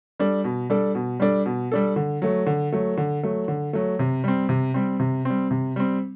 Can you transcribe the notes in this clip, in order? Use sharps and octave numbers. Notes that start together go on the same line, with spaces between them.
G3 D4 A4
B2
G3 D4 A4
B2
G3 D4 A4
B2
G3 D4 A4
D3
F#3 A3
D3
F#3 A3
D3
F#3 A3
D3
F#3 A3
C3
G3 C4
C3
G3 C4
C3
G3 C4
C3
G3 C4